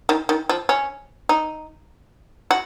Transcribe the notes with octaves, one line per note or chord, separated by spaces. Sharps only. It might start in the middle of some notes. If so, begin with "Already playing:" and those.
D#3
D#3
F3
C#4
D#4
F#4